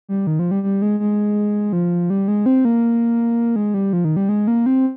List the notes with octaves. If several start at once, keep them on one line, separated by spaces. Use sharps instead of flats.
G3
D#3
F3
G3
G3
G#3
G#3
F3
G3
G#3
C4
A#3
G#3
G3
F3
D#3
G3
G#3
A#3
C4